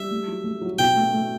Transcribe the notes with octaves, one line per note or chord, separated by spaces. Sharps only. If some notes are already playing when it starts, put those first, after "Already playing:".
Already playing: G3 E5
A3
F#3
A3
F#3
B2 G5
A3
A3